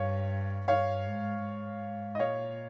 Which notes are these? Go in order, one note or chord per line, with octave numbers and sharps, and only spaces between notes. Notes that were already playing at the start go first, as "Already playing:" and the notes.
Already playing: G2 C#5 F5
G2 C#5 F5
G#2
G#2
D#5
A#2 C#5 F5